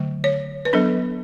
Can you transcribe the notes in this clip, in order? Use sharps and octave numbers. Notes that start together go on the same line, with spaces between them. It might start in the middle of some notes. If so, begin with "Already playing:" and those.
Already playing: D3 F#3 A3
C#5
B4
F#3 B3 D4 A4